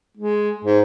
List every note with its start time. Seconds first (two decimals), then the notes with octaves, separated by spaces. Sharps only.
0.17 G#3
0.64 G#2